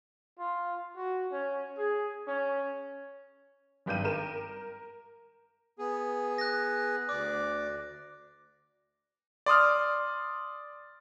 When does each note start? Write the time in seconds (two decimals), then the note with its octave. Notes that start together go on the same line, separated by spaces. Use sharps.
0.39 F4
0.96 F#4
1.31 C#4
1.78 G#4
2.27 C#4
3.86 G#1 G2 G5 G6 D#7
4.04 A#4 E7
5.79 B3 G#4
6.38 F#6 A#6
7.09 D2 D5 D6
9.46 D5 C6 D#6 F6